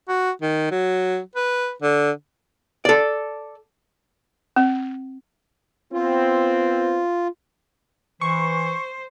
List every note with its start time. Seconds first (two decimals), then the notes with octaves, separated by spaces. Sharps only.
0.08 F#4
0.41 D#3
0.71 F#3
1.35 B4
1.82 D3
2.85 A4 D5
4.56 C4
5.93 B3 C4 F4
8.21 E3 C5 C#6